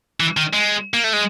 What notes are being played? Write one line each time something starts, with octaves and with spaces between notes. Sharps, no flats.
E3
D#3
G#3
A#3
A3
G#3